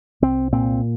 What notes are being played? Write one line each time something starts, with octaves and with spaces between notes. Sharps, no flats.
C2 C4
A#2 C4